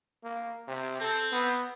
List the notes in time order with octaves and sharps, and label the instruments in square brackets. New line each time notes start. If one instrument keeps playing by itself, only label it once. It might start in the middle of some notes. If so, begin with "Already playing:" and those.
[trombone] A#3
C3
[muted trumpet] C4 [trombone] A4
[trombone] B3